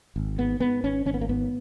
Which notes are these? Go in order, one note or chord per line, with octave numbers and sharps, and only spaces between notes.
G#1
G#2 B3
G#2 B3
G#1 C#4
G#1 C#4
B3
A#3
G#2 B3